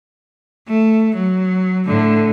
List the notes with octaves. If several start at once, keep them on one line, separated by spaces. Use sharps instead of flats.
A3
F#3
A2 D3